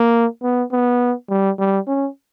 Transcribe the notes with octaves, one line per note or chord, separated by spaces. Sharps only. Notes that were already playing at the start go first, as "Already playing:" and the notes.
Already playing: A#3
B3
B3
G3
G3
C#4